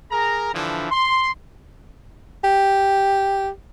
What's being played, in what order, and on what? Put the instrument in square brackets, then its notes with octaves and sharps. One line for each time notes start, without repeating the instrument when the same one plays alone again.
[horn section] G#4 A#4 A#5
D3 E3 F3 D4 E4
C6
[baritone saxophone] G4